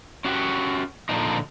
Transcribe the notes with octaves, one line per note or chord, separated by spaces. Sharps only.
C#4 F#4 G4
A#2 D3 F3 C4 D4 D#4